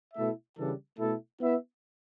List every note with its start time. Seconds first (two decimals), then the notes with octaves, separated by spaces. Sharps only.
0.14 B2 A3 E4 A4 E5
0.57 C#3 E3 G3 D4 A4
0.98 B2 A3 E4 A4
1.40 B3 E4 B4 E5